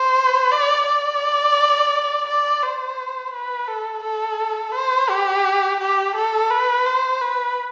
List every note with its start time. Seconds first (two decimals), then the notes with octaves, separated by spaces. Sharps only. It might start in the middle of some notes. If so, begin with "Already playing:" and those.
Already playing: C5
0.51 D5
0.86 D5
2.28 D5
2.63 C5
3.33 B4
3.68 A4
4.04 A4
4.74 C5
5.09 G4
5.80 G4
6.16 A4
6.50 B4
6.86 C5
7.21 B4